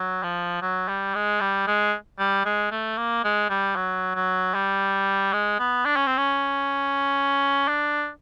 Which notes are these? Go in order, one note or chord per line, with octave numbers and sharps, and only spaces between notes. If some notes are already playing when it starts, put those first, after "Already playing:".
Already playing: F#3
F3
F#3
G3
G#3
G3
G#3
G3
G#3
A3
A#3
G#3
G3
F#3
F#3
G3
G#3
B3
D4
C#4
C4
C#4
D4